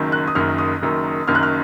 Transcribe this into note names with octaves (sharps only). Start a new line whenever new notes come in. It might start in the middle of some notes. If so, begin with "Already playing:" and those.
Already playing: F#1 F#2 D#3
F#6
D#6
F#1 F#2 D#3 F6
D#6
F#1 F#2 D#3
F#1 F#2 D#3 F6
F#6
F6